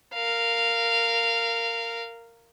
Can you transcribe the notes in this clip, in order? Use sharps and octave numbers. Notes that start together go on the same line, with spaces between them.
A#4 F5